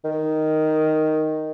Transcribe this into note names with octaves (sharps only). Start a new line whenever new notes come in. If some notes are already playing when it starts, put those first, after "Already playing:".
D#3